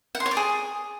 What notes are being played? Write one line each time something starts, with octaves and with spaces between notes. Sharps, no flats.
F#5
C6
C#5
D5
G#4